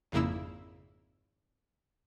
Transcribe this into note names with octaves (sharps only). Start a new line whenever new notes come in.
G#1 F2 C#3 A#3 E4 E6